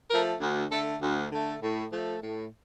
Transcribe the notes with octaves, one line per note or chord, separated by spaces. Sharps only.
F3 A3 A#4
D2
D3 A3 A4
D2
D3 A3
A2
F3 A3
A2